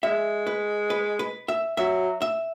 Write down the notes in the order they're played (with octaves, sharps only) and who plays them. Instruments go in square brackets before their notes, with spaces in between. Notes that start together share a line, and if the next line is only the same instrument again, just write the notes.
[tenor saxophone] G#3 [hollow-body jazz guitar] E5
[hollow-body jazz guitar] B4
B4
B4
E5
[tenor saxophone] F#3 [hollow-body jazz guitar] E5
[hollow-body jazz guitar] E5